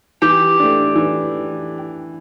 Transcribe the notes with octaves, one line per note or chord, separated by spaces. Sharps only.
E3 G4
A3 D4
E3